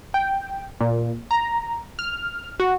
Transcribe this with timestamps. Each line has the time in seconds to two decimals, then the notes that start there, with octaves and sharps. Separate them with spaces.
0.14 G5
0.81 A#2
1.31 A#5
1.99 F6
2.60 F#4